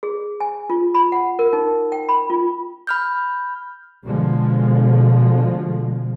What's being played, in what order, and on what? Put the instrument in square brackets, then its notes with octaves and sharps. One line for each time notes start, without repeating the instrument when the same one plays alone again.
[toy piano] G#4
G#5
F4
B5
F#5
A#4
D#4
G5
B5
F4
[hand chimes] B5 F6 G6
[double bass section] B2 D3 F3 G#3